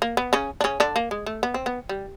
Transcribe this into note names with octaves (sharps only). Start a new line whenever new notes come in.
A#3
B3
C#3 C#4
D4
C#3 C#4
D3 D4
A#3
G#3
A3
B3
C4
B3
G3